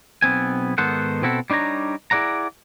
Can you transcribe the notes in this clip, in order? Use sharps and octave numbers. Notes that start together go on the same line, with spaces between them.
B1 B3 C4 G#5
G#2 D#3 B3 A4 C5 F#5
B2 C4 E4 F#4 A4
G3 D4 D#4 C#5 A#5
E4 G#4 D5 F#5 A#5